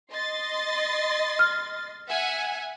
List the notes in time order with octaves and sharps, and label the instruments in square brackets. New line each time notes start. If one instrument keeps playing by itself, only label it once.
[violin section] D#5 C6 A6
[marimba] F6
[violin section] E5 F#5 G#5